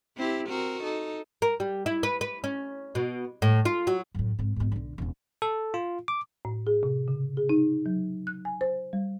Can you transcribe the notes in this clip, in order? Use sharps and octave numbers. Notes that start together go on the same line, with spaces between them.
C4 E4 G4
C4 F#4 A#4
D#4 A4
A#4
G3
E4
B4
B4
C#4
B2
A2
F4
F#3
F#2 A2
G#2 C3
G#2 B2
B1 D3
E1 C#3
A4
F4
D6
A2
G#4
C3
C#3
G#4
D#4
F#3
F#6
G#5
C5
G3